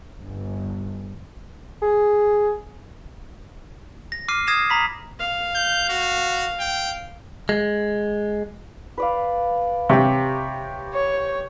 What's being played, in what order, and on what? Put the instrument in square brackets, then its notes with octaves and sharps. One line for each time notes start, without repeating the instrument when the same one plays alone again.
[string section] G1
[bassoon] G#4
[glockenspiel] A#6
D6 F6 C7 D#7
D#6 G#6 A#6 C7 E7
A#5 B5 B6
[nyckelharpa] F5
[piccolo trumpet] G6
F#4
G5
[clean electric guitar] G#3
[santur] B4 D5 F5
[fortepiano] C3 [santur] G4 C#5
[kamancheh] C#5